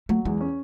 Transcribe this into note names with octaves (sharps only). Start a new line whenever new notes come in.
F#3 A3
E2 G#3
C#4